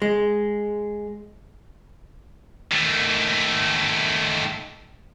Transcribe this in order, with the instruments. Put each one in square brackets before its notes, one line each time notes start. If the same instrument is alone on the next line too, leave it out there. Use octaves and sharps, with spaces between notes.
[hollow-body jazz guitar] G#3
[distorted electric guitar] D#3 A3